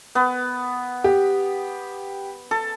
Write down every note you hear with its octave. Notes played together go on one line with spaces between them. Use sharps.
B3
G4
A4